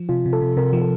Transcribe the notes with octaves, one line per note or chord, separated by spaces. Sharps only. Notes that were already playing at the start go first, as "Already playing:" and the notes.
Already playing: F3
C3 F4
C3
A4
C3
C3 A#4
F3
A4